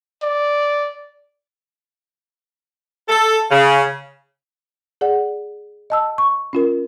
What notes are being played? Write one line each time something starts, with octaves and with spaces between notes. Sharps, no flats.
D5
A4
C#3
G#4 D5 F#5
D#5 A5 E6
C#6
C#4 F4 A#4